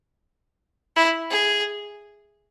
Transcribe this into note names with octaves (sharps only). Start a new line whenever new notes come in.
E4
G#4